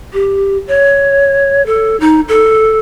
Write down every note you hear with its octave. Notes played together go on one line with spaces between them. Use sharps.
G4
C#5
A4
D#4
A4